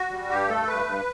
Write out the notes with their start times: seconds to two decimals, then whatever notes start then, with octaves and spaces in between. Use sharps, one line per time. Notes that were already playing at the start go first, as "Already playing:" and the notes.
Already playing: F#4
0.11 G3
0.29 G2 G4
0.49 A3 A4
0.68 G2 B4
0.86 G2